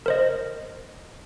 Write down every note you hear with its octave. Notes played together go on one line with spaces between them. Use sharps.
A#4 C5 D#5